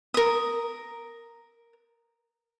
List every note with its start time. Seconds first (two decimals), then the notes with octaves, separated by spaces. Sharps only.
0.14 A#4 D#6